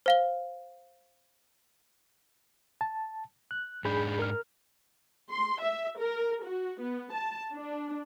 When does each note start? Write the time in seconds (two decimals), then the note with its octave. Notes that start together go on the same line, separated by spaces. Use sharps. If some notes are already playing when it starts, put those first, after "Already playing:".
0.06 C5 F5 G7
2.81 A5
3.51 F#6
3.85 G#2 D4 G#4 B5 G6
4.19 A#4 F6
5.30 C6
5.61 E5
5.98 A#4
6.44 F#4
6.81 B3
7.14 A5
7.53 D4